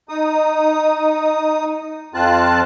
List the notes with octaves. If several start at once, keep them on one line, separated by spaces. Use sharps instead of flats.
D#4 D#6
F2 C4 F4 A5 F#6